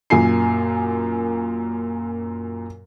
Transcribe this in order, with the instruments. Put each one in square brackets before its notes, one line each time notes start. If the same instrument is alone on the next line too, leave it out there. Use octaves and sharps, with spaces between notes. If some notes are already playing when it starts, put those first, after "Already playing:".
[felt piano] F#2 A#2 G#5 C7